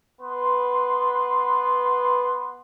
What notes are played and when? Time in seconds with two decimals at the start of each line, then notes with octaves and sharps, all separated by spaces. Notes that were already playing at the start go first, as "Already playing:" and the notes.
0.21 B3 B4 C6